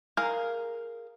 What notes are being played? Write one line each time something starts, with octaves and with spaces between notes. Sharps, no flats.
G#4 A#4 F5